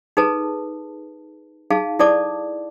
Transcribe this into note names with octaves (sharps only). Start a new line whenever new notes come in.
D#4 G#4 A4 B4 A5
D#4 G#4 F5 A5
E4 A4 D5 A5 D6